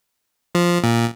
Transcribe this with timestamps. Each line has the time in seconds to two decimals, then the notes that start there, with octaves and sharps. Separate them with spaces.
0.55 F3
0.84 A#2